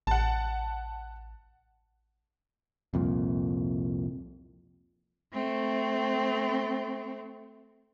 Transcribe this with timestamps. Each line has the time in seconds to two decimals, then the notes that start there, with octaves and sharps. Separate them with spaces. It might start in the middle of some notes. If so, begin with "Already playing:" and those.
0.07 A1 F#5 A5
2.94 C2 F2 A#2
5.32 A3 C4